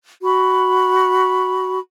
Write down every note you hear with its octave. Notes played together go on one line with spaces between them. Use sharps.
F#4 B5